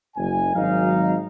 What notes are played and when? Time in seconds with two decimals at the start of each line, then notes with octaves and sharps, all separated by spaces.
0.16 F#1 G#5
0.55 G#1 F#3 D#4 F5